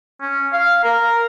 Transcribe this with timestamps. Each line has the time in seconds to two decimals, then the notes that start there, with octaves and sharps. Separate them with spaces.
0.21 C#4
0.53 F5
0.84 A#4